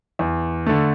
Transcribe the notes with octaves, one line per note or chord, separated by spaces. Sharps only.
E2
D3 A3